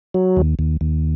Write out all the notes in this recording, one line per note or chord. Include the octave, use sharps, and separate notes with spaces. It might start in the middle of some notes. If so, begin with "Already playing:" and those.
F#3
D#2
D#2
D#2